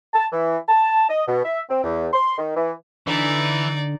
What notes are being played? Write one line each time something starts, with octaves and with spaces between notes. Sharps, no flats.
A5
E3
A5
D#5
B2
E5
C4
E2
C6
D#3
E3
D3 E3 D#4 D5